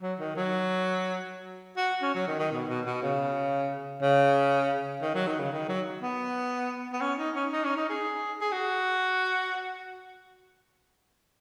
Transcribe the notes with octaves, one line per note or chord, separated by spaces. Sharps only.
F#3
D#3
F#3
F#4
C#4
F#3
D#3
D#3
B2
B2
B2
C#3
C#3
D#3
F#3
D#3
C#3
D#3
F#3
B3
B3
C#4
D#4
C#4
D#4
C#4
D#4
G#4
G#4
F#4